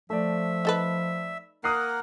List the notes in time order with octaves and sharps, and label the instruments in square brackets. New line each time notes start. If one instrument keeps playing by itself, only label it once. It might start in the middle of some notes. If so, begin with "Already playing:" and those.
[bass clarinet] F3 [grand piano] A3 D5 [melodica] E5
[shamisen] D#4 A4 B4
[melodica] A#3 A#4 F#5 [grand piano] D#6 F#6 C7